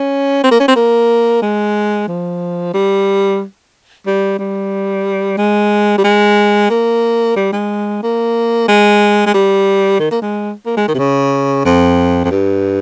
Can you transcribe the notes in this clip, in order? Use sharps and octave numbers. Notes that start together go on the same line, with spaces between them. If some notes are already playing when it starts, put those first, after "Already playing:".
Already playing: C#4
C4
A#3
C#4
C4
A#3
G#3
F3
G3
G3
G3
G#3
G3
G#3
A#3
G3
G#3
A#3
G#3
G#3
G3
D#3
A#3
G#3
A#3
G#3
D#3
C3
C#3
F2
F2
G2